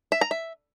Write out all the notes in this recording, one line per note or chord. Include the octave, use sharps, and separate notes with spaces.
E5
A#5
E5